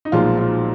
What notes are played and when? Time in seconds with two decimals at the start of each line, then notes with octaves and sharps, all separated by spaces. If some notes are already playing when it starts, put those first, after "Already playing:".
0.05 D#4
0.12 B1 A#2 F3 G#3 F4
0.39 F4